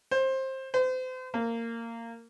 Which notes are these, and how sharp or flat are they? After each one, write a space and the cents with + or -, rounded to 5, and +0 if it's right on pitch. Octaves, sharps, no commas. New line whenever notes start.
C5 +20
C5 -35
A#3 -15